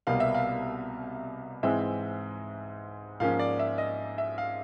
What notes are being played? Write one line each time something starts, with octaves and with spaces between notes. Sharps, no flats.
C2 B2 G3 A#3 F5
E5
F5
G#2 E3 G#3 C4 E5
G#2 F3 A#3 C#4 F5
D5
E5
D#5
E5
F5